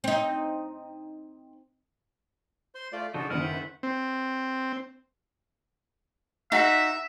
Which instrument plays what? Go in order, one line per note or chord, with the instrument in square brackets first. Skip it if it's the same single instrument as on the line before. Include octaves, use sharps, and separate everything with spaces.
[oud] C4 D#4
[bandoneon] C5 C6
A3 F4 D5
[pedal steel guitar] C#3 F3 D#4 [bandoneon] D4 F#4 A4
[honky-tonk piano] F#1 D#3 [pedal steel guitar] D#4 E4 F6 [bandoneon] B4 E5 F#5
[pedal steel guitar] D3 B3 C5
[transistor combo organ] C4
[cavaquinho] D#4 F#4 F#5 [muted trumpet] E5